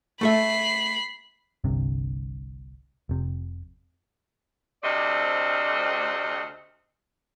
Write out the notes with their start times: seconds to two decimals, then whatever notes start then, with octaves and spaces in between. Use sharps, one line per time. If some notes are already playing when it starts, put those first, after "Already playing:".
0.21 A3 A4 E5 B5 C7
1.64 G1 C2 G2 C3
3.09 F1 C3
4.83 D2 C3 A3 C4 D5 D#5